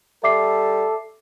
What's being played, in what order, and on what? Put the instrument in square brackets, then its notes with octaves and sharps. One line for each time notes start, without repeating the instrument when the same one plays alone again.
[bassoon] G3 [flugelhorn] A4 [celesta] E5 D6 C7